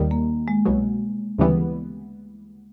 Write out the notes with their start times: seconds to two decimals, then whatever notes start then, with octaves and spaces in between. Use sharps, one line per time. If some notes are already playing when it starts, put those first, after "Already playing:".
Already playing: D#2 D#3 G3
0.11 A#3
0.48 G#3
0.65 C2 B2 F#3
1.38 D2 C#3 E3 G3 B3